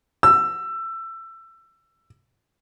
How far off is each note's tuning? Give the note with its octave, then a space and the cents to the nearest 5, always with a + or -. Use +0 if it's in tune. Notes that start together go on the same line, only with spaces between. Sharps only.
E6 +20